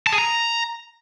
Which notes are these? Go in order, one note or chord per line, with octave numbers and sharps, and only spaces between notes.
A5
G#4
A#5